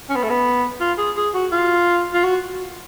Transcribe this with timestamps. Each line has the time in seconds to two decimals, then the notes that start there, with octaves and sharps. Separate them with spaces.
0.09 C#4
0.16 B3
0.23 A3
0.30 B3
0.80 F4
0.98 G#4
1.17 G#4
1.34 F#4
1.52 F4
2.14 F4
2.24 F#4